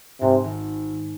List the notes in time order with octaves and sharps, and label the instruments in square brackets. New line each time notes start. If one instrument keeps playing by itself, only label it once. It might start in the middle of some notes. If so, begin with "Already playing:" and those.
[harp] G#2 [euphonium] C3
[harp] G#1